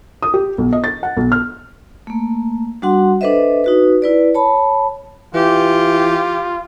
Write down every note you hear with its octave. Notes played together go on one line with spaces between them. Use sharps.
D#6
G4
B1
D#5
A6
F#5
B1
F6
A3 A#3
G3 D4 F#4 F#5 C6
D4 A4 B4 C5 D#5 E5
D#4 F#4 B4
E4 B4 D5
C#5 A5 B5
E3 F4 G4